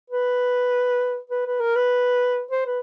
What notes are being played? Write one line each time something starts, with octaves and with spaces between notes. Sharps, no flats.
B4
B4
B4
A#4
B4
C5
B4